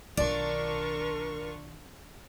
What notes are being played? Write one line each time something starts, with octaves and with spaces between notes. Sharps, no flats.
B1 D#3 D4 F4 A#4 D5 C#6